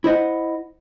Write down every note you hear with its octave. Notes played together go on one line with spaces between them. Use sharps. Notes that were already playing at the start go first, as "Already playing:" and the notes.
E4 C5 D#5 F#5